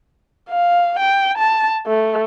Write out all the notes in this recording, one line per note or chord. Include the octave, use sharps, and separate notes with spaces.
F5
G5
A5
A3